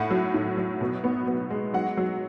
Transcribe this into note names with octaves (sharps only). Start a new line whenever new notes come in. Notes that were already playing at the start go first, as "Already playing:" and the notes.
Already playing: A2 A3 F#5
F#3
A2
F#3
B2
B3
B3
G#3
F#3 F#5
F#3